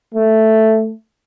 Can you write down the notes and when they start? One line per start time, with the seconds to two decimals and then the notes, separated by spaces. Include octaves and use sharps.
0.14 A3